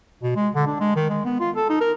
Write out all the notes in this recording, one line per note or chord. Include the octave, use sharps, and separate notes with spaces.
B2
G#3
D3
D4
G#3
D#3
G#3
B3
F4
A4
D#4
A#4